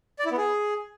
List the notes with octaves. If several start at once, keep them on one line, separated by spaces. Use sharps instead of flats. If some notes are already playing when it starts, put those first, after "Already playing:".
D5
E4
B3
G#4